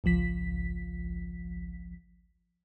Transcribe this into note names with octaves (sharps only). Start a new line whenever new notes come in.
G#1 C#2 F3 B6